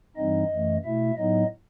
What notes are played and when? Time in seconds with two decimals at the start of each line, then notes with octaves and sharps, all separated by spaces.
0.17 G2 E3 G3 C4 D#4 D#5
0.51 F#2 E3 A3
0.84 B2 A3 E4 E5
1.17 A2 F#3 B3 D#4 D#5